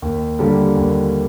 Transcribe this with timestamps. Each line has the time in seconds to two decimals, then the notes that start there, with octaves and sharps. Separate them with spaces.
0.02 D#2
0.39 D3 G3 A#3
0.77 D#2